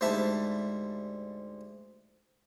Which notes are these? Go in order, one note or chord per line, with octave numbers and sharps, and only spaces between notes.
D2 G#2 G3 E5 A5